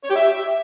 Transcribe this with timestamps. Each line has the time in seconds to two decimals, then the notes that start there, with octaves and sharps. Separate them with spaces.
0.03 C#5
0.09 G4
0.16 E5